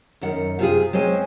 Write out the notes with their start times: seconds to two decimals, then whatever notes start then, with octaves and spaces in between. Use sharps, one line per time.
0.21 F#2 D#3 F#5
0.59 C3 F4 G#4
0.93 G#3 C4 C#4 C5 G#5